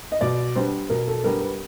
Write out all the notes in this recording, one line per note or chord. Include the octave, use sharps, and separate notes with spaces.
D#5
B2 D5
G3 B3 D4 C5
B2 A#4
A4
G3 B3 D4 A#4
B4